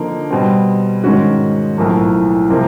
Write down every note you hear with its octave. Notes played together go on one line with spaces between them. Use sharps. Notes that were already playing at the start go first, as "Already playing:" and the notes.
Already playing: D3 F3 A#3 D#4
B2 G3 C4
G#2 D#3 G#3 C#4 F#4
B1 A2 F3 A#3
C3 F3 A#3